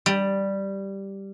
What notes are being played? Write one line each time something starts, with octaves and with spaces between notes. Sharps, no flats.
G3